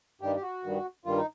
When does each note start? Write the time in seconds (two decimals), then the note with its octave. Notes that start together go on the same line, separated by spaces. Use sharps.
0.21 G2 D#3 G3 G4
0.36 G4
0.42 F#4
0.63 G2 D#3 G3
1.05 G2 D#3 G3 F4
1.17 D#4